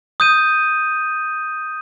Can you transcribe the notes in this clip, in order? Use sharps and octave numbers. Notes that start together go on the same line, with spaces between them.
D#6 G6 D#7